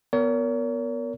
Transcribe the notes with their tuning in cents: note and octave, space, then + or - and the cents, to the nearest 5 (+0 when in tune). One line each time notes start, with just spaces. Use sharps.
B3 +0 A#4 -5 C#5 +40